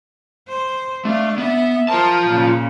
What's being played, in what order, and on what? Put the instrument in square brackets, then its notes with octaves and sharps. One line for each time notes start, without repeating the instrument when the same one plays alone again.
[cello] C5
[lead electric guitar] A3 [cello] D4 F5
[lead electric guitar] B3 [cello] E5
[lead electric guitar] F4 A5 [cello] A#4 C5
[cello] A#2 C#3